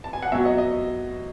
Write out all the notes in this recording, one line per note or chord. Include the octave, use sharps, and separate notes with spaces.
A5
G#5
F#5
B2 F#3 E5
D#5
D#5